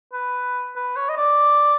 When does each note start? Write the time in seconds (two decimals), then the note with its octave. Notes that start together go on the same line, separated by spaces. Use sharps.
0.13 B4
0.76 B4
0.96 C#5
1.09 D#5
1.17 D5